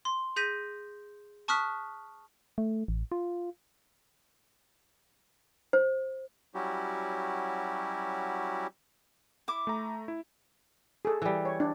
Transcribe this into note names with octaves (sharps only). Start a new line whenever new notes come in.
C6
G#4 G6 A#6 B6 D#7
A5 C#6 D#6 F6 F#6 B6
A3
A1
F4
C5
F#3 G3 C#4 E4 F#4 G4
E4 D6
A3 A#5
E4
G#4 A4
E3 G3
C#5
D4